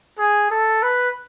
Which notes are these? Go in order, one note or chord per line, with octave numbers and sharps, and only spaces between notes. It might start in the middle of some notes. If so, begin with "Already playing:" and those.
G#4
A4
B4